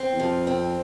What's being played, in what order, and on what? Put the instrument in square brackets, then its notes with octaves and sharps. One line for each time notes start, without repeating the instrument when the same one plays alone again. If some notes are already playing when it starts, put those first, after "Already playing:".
Already playing: [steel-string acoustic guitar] C4
[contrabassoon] E2
[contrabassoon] F2 [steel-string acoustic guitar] F3
[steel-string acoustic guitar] C4